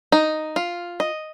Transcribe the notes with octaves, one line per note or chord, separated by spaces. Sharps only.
D#4
F4
D#5